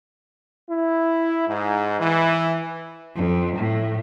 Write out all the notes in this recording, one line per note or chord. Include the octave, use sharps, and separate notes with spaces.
E4
G#2
E3
F2
A2